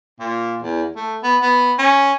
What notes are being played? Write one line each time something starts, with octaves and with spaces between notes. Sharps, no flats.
A#2
E2
A3
B3
B3
C#4